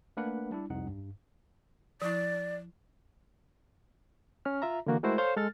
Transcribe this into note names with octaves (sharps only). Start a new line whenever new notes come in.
A3 A#3 D4 A#4 B4 F#5
G3 D4 E4
C2 F2 D#4 F#5
G2
F3 E4 D5
C#4 F6
F4 E5 A#5
D3 E3 A#3 F#4
G#3 A3 E4 F#4 A#4 C5
A4 C5 C#5 F5
G#3 A4 F6 A6